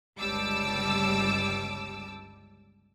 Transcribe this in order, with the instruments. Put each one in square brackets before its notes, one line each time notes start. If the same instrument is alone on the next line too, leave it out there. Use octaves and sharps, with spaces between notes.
[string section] G1 C#2 G3 A5 D6 E6